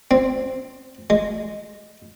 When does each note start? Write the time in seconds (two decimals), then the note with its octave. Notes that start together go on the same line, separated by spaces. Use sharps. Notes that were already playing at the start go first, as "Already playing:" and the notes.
0.11 C4
1.10 G#3